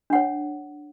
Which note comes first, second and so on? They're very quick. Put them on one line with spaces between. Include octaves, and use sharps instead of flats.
D4 F#5 C#5